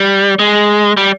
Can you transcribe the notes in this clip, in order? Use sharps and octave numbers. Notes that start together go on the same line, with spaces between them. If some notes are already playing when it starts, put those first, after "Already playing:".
Already playing: G3
G#3
G3